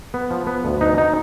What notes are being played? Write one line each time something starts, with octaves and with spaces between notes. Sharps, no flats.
B3
F3
B3
D2
B3 D#4
D#4